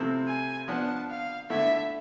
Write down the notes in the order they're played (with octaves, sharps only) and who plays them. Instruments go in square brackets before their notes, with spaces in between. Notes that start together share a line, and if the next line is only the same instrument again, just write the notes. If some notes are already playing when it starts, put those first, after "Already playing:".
Already playing: [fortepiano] C3 F3 A3 C4 E4
[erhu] G#5
[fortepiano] F3 B3 D4 [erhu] A5
[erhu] F5
[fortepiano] D3 A3 E4 [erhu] E5